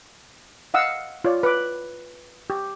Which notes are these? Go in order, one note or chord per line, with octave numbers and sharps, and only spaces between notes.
D#5 F5 F#5 E6
F4 C#5 D5
B4 D6
G4